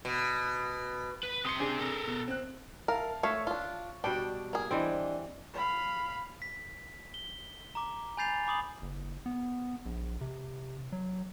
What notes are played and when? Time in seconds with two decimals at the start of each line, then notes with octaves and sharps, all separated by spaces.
0.05 B2
1.23 B4
1.45 C3 C6 D#6 C#7
1.59 D4 G#4
1.79 A4 A#4
2.07 B2
2.28 C4 F#6
2.88 A#4 E5 F5 A5
3.23 A3 C#5 E5 F5 C#6
3.47 D4 F4
4.04 B2 G3 D4 G5
4.53 A#3 G#4
4.71 E3 C4 D4 D5 D#5
5.54 F5 B5
6.42 B6
7.14 G7
7.75 A#5 D6
8.17 G#5 B5 G6 A6 C7 F7
8.47 B5 D6 D#6 F#7
8.82 F#1
9.26 B3
9.86 A#1
10.21 C3
10.92 F#3